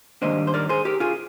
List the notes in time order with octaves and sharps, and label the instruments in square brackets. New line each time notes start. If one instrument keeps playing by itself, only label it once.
[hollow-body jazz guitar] G#2 D#3 G3 A#3 D4 C5 D#5
C5
A#4 D5
G#4 C5
G4 A#4
F4 G#4